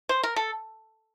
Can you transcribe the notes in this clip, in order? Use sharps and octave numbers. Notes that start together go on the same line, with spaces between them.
C5
A#4
A4